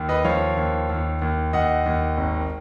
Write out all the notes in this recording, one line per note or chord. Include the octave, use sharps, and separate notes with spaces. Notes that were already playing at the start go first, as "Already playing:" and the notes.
Already playing: D#2
B4 D#5
F3 C#5 F5
D#2
D#2
D#2
D#2 D#5 F#5
D#2
G#1